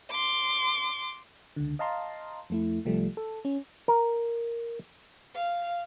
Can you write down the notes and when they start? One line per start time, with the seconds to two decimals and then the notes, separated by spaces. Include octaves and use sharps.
0.11 C6 D6
1.56 C#2 D3
1.79 D#5 F5 A5 A#5 C6
2.50 F2 A3 E4
2.85 C2 F3 G3 A3
3.17 A4
3.45 C#4
3.88 A#4
5.35 F5